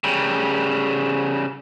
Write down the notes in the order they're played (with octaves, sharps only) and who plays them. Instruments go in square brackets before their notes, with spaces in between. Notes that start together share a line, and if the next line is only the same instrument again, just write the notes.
[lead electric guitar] C#3 G3